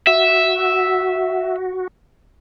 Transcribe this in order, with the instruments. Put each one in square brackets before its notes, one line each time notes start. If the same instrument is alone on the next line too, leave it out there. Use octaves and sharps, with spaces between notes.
[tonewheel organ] F#4 [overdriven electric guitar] E5